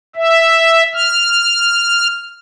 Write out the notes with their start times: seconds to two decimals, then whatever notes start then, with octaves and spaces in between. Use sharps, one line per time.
0.16 E5
0.94 F6